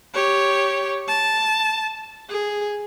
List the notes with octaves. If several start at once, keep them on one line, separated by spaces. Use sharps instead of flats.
G4 C#5
A5
G#4